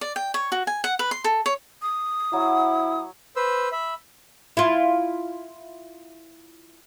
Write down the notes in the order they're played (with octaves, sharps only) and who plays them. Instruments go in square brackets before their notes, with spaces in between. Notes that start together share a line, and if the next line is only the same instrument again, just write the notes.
[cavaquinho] D5
G5
C#5
F#4
G#5
F#5
B4
C6
A4
C#5
[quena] D#6
[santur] F#3 [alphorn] E4
[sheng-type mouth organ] B4 C5 E6
E5 B5
[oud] E4 F4